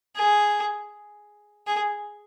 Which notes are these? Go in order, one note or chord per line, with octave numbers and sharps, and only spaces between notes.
G#4
G#4